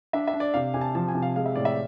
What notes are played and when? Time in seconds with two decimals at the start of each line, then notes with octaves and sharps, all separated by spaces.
0.13 D4 E5
0.27 E5
0.34 D4
0.40 D5
0.54 C3 F5
0.74 C3 G#5
0.81 A5
0.95 F3 A5
1.08 G#5
1.15 C3
1.22 F5
1.36 G#3 F5
1.46 E5
1.56 A2 D5
1.65 E5